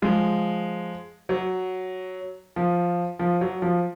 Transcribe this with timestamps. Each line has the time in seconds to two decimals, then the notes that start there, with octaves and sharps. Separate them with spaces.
0.02 F3 G#3
1.29 F#3
2.56 F3
3.19 F3
3.41 F#3
3.62 F3